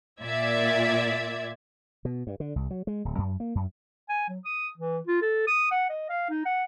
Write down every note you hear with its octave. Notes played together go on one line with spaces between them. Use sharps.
A#2 D5 E5 G#6
B2
G2
D3
C2
F#3
G#3
D1
F#2
A#3
F#2
G#5
F#3
D#6
E3
F4
A4
D#6
F#5
D#5
F5
D#4
F#5